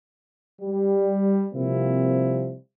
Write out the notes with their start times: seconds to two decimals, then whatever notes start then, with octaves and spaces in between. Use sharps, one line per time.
0.62 G3
1.54 C3 F3 G3 A#3 C4 E4